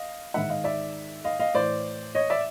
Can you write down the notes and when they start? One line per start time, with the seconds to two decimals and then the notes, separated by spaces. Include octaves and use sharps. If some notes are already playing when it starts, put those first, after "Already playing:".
Already playing: D#5 F5
0.34 G#2 D#3 E5 F#5
0.49 D#5 F5
0.64 D5 E5
1.24 D#5 F5
1.40 D#5 F5
1.54 A2 E3 C5 D5
2.15 C#5 D#5
2.30 D5 E5